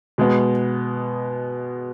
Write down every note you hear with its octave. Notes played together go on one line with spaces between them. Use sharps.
B2 G#3 B3